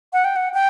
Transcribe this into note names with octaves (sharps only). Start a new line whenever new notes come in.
F#5
G5
F#5
G5